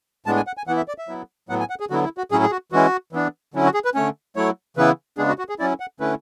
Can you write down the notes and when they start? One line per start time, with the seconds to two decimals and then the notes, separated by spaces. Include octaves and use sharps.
0.26 A2 G#3 B3 D4 A5
0.37 G#5
0.47 F#5
0.57 G#5
0.67 E3 B3 E4 F#5
0.77 E5
0.88 D5
0.98 E5
1.08 F#3 B3 E4
1.49 A2 F#3 B3 F#5
1.60 G#5
1.70 F#5
1.80 G#4
1.90 D3 F#3 B3 E4 F#4
2.04 E4
2.18 F#4
2.31 A2 F#3 C#4 E4 G#4
2.43 G#4
2.51 F#4
2.72 E3 G#3 C#4 E4 F#4
3.13 E3 B3 D4
3.54 D3 F#3 C#4 E4
3.65 F#4
3.74 G#4
3.85 B4
3.95 D3 A3 C#4 C#5
4.36 F#3 A3 E4 C#5
4.77 C#3 E3 B3 E4 B4
5.18 C#3 G#3 B3 D4 G#4
5.28 F#4
5.39 F#4
5.49 G#4
5.59 F#3 C#4 E4 D5
5.80 F#5
6.00 D3 A3 C#4 E4 B4